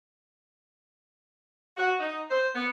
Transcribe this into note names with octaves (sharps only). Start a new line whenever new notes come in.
F#4
D#4
C5
B3